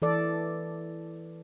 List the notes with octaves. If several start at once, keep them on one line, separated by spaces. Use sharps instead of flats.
E3 A4 D5